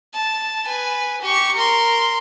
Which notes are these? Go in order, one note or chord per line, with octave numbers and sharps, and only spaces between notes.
A5
B4 G#5
G4 C#6
A#4 C6